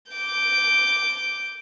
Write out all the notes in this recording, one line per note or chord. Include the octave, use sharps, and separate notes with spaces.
D6 G6